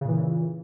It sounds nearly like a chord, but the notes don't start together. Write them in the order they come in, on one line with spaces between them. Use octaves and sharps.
C#3 A#2 E3